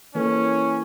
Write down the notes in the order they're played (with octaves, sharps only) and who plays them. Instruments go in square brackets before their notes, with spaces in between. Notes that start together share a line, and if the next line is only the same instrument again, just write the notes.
[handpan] E3 A#3 A4 [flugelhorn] C#4